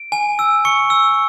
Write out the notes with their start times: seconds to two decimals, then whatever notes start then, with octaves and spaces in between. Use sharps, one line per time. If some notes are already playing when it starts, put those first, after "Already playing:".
Already playing: D7
0.12 G#5
0.39 E6
0.65 C#6 C#7
0.90 E6